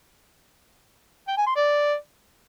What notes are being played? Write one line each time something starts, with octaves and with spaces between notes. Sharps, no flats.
G5
G#5
C6
D5